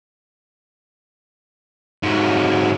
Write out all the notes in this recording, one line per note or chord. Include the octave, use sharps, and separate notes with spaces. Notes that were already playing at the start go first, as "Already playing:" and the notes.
G#2 F#3